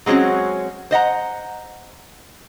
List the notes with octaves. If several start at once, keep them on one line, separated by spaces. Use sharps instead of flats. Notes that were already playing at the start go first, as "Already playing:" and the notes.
F#3 G#3 C4 C#4 F#4
C5 D#5 F#5 A#5